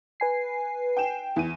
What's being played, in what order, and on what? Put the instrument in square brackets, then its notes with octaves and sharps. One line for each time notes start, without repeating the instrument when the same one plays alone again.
[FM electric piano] B4 G#5 C7
[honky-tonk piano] G5 E7
E2 D#7